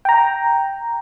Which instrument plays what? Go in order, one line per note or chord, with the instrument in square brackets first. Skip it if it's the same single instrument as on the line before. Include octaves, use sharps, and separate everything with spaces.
[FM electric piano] G5 A#5